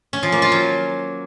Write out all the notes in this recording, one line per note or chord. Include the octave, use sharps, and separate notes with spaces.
C#4
F3
A#3
F4
F#3